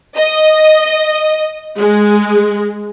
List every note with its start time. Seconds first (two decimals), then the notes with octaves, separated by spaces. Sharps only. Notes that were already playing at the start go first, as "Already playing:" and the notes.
0.17 D#5
1.77 G#3